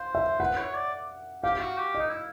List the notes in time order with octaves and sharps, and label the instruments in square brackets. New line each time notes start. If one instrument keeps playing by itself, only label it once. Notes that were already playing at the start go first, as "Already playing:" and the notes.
Already playing: [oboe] C5 [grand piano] F5
[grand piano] E5
[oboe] B4 [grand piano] F#5
[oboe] C#5
D5
[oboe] G4 [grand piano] F5
[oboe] G4
F#4
G4
[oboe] D#4 [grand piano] D#5
[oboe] E4